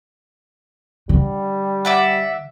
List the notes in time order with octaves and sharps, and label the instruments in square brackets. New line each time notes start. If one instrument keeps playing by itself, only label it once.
[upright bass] D3 [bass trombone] G3
[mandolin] D5 E5 F#5